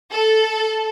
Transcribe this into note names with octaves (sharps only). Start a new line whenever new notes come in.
A4